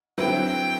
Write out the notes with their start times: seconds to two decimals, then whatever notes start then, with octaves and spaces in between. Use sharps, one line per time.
0.18 D3 F#3 C4 E4 B4 G5